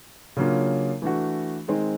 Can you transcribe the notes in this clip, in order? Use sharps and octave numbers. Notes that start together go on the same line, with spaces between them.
C#3 F#3 A#3 D4 F4
E3 A3 D4 F#4
D#3 G#3 C4 D#4